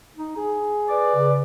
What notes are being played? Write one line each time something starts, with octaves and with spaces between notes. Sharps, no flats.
D#4
G#4
B4 D5
C#3